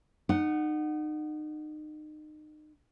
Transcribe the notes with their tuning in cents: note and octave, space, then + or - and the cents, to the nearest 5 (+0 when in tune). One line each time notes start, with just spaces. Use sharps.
D#4 -30 F#5 +0